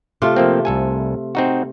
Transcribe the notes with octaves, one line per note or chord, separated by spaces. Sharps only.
C3 A3 F4
F3 A#3 C4
C2 A4 G#5
C4 D#4 F#4